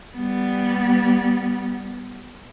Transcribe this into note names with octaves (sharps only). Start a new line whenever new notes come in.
G3 B3